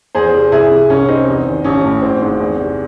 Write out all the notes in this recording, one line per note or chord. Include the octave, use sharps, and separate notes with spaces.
E2 G#4 C5
C3
C2 E4 G#4
C3
C2 C#4
C3 C4 D#4
E2
D#3
A1 C#4
A2
G#1 C4
G#2
E2
C3